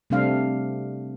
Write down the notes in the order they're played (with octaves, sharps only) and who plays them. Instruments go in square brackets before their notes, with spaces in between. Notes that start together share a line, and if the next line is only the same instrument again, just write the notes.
[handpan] C3 G3 A3 C4 D4 F5